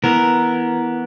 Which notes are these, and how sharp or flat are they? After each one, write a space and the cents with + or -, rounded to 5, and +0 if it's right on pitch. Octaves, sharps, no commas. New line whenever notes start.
E3 +0 B3 -10 A#4 +0